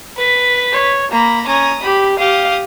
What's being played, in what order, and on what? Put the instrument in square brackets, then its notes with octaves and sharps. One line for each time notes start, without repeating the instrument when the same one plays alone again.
[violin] B4 B6
[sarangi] C#5
[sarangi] A#3 [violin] A#5 B5
[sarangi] C#4 [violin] A#5 D#6
[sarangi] G4 [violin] B5
[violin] G4 D#6 [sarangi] F5